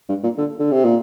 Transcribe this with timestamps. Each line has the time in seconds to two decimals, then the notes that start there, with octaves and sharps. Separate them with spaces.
0.09 G2
0.23 A#2
0.38 D3
0.59 D3
0.71 C3
0.85 A#2